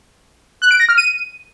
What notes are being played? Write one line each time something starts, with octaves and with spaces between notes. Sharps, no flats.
F#6
D7
A#6
F6
D#7